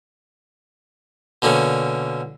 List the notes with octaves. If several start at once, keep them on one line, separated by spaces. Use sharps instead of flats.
B2 D3 A#3 C#4